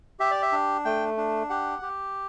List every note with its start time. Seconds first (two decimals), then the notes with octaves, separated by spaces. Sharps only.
0.20 G4 E5
0.31 D5
0.42 E5
0.52 D4
0.85 A3 G5
1.17 D4
1.50 G4 F#5
1.82 G4